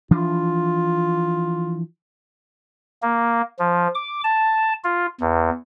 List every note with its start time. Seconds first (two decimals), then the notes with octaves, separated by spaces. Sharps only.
0.11 E3 F3 D4 F4
3.02 A#3
3.59 F3
3.95 D6
4.24 A5
4.84 F4
5.20 E2